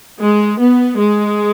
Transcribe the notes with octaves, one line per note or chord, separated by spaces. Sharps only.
G#3
B3
G#3